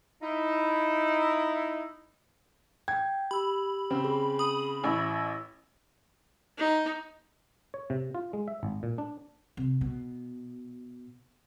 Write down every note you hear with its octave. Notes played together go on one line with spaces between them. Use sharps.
D#4 E4
G5 G#6
G4 B5 E6
C#3 C4
G#4
B5 D#6
A1 E4 C#6 E6
D#4
C#5
C3
F4
G#3
E5
G#1
A#2
D4
C3
B2